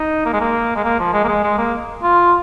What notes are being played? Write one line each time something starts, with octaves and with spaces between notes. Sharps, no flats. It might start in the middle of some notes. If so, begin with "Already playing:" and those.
Already playing: D#4
A#3
G#3
A#3
G#3
A#3
F3
G#3
A#3
G#3
G#3
A#3
F4